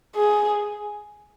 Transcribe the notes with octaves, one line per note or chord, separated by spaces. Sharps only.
G#4